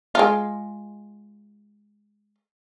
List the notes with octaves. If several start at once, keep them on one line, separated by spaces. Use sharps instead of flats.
G#3 F4